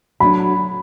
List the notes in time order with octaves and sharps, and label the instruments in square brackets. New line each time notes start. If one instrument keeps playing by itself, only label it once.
[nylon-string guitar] F#3 A3 D4 [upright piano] B5